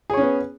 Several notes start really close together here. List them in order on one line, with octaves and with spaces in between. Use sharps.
G#4 C#5 C#4 B3